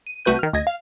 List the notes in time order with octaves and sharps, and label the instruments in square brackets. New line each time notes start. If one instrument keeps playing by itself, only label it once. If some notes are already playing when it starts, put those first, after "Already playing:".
[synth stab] D#7
C2 A3 F#4 B4 G6 D#7
D#3 F6
D2 D#5 G#6 A#6
F5